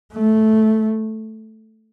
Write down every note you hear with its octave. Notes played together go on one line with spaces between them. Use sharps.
A3